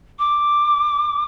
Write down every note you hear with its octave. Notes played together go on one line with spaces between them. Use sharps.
D6